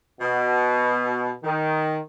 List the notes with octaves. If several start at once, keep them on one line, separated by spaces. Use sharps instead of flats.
B2
D#3